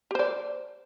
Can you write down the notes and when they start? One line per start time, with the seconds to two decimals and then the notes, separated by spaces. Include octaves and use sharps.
0.11 G4
0.15 C5
0.19 D5